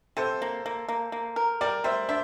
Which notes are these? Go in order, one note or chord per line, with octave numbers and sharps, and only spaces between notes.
C3 A4 C5
A#3
A#3
A#3
A#3
A#4
G3 A#4 D5
G3 C5 E5
D4 C5 E5